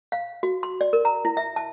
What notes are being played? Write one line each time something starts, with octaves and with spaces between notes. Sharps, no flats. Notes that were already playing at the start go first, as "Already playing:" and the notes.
F5
F#4
C6
D5
A#4
A#5
E4
E5
A5